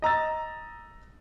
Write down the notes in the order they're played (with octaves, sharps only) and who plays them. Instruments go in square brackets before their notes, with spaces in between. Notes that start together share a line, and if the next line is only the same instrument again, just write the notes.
[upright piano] D#5 A#5 E6 A6